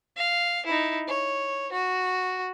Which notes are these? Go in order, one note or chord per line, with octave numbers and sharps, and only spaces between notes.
F5
D#4 E4
C#5
F#4